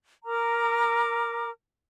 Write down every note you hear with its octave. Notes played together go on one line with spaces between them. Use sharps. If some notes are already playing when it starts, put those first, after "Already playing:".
A#4 A#5 D6 F6